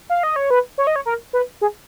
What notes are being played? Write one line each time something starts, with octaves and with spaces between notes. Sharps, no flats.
F5
D#5
C#5
B4
C#5
D#5
C#5
A#4
B4
G#4